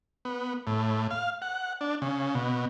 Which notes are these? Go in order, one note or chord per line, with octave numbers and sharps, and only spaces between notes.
B3
A2
F5
F#5
D4
C#3
B2